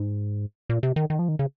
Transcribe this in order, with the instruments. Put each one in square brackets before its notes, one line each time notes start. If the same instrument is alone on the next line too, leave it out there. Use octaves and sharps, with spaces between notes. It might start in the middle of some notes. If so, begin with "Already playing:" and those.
Already playing: [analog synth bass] G#2
A#2
C3
D#3
D#3
F3
D#3
C#3